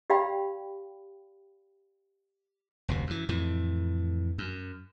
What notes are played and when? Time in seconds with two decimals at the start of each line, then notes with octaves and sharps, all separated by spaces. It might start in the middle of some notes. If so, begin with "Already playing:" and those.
0.10 G4 D5 F5 G5 B5
2.88 F1 D2 C3
3.07 F#2 E3
3.29 F2 A2 E3
4.38 F#2